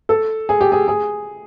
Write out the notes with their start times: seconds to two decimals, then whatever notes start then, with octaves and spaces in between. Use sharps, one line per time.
0.09 A4
0.49 G#4
0.61 G4
0.72 G#4
0.88 G#4